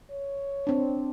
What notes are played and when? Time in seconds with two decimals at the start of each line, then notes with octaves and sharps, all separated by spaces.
0.11 C#5
0.67 C4 D4